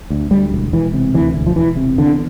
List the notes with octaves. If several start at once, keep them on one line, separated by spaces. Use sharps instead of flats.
D2
D2 G3
E1
E1 E3
C3
D2 E3
E1
F3
E1 E3
C3
E2 D3